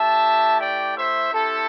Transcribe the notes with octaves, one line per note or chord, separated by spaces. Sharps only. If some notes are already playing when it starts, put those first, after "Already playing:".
Already playing: A3 E4 G4 E5 A5
D5 G5
C5 E5
C4 E4 G4 A4